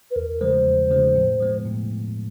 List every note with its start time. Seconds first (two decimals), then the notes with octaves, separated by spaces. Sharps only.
0.11 B4
0.16 E2 A#4
0.41 C#3 F3 G#3 C5
0.66 E2
0.91 C#3 F3 G#3
1.15 A2
1.40 F3 G#3 B3
1.65 A2